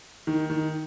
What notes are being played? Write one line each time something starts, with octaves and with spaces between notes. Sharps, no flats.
D#3
D#3